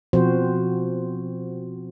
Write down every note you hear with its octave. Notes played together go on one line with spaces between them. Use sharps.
B2 F3 C4 F#4 C5